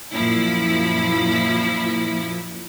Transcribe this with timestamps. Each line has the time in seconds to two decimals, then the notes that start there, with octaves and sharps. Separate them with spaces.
0.14 F#2 A#2 F3 E4 B5